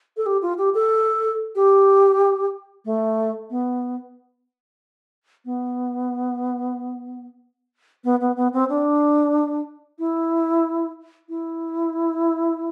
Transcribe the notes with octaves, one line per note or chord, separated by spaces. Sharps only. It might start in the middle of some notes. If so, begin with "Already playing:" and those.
A4
G4
F4
G4
A4
G4
A3
B3
B3
B3
B3
B3
C4
D4
E4
E4